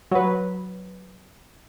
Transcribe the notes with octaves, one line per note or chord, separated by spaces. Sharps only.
F#3 B4